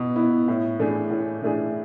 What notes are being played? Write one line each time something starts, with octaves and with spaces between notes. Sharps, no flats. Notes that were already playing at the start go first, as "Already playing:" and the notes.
Already playing: B2 B3 E4
B3 E4
A2
E3 A3 D4 G#4
A2
E3 A3 D4 G#4